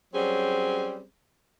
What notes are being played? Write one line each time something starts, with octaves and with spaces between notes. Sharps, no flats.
F#3 G3 C4 C#4 G#4